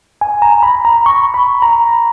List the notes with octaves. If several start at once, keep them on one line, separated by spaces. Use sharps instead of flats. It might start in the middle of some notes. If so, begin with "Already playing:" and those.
G#5
A#5
B5
A#5
C#6
B5
A#5